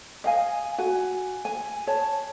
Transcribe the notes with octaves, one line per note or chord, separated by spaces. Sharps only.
D#5 F5 G#5
F#4 G#5
G#5
C#5 A5